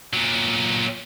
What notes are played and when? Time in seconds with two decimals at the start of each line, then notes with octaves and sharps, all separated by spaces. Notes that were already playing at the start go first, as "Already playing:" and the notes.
0.13 A#2 F#3